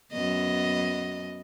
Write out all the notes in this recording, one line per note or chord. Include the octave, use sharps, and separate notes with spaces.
F#2 B3 D#5